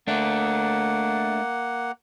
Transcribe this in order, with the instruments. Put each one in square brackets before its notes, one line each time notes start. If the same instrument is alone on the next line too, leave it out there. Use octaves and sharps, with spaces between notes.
[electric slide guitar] A3 D4 [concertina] A#3 F#5